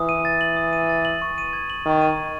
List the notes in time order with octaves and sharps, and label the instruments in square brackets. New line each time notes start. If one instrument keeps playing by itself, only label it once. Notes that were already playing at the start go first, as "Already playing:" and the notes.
Already playing: [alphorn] E3 [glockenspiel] D#6
[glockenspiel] D#7
A6
F#7
D#6
D#7
A6
F#7
C#6
D#7
G#6
F#7
[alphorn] D#3 [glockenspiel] C#6
[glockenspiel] D#7
G#6